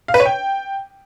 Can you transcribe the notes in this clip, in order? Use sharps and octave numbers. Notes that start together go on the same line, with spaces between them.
F5
B4
C#5
G5